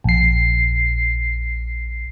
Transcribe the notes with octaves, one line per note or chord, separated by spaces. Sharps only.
A#1 C7